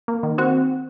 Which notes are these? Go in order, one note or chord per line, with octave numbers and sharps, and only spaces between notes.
A#3
D#3
C4 F#4